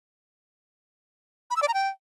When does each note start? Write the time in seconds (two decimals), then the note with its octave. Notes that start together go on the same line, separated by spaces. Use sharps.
1.50 B5
1.56 E6
1.62 D5
1.68 A#5
1.74 G5